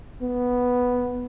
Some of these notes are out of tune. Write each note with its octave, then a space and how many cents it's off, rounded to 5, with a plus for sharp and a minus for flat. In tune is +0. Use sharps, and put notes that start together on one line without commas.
B3 +0